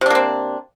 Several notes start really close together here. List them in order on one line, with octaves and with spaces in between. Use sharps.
C3 D4 A#3 C4